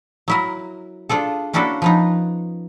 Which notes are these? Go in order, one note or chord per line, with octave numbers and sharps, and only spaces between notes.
F#3 E4 A#4
D4 F4 G#4 A4
A#3 C#4 D4 E4 F#4 A4
F3 B3 D#4